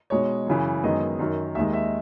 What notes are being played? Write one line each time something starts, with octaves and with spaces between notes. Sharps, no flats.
B2 G#3 D#4 C#5
F#2 C#3 E3
F#2 D#3 G#3 B3 D#5
F#2 D#3 F#3
D#2 D#3 G#3 E5
E5